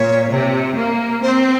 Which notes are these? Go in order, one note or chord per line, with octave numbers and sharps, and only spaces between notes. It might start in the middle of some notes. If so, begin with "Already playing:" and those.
Already playing: A#2 C#5
C3
A#3
C4 C5